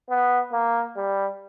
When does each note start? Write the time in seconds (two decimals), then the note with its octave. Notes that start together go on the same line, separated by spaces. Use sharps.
0.10 B3
0.53 A#3
0.97 G3